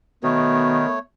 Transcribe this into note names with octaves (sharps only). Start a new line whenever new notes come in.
B2 D#3 A3 B3 C#5